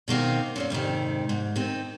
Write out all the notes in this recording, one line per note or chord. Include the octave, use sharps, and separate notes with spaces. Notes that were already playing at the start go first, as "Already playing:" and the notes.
B2 D#3 A#3 C4
F#2 A#2 A#3
F2 G#2 C3 D#3
G#2
D#3 C4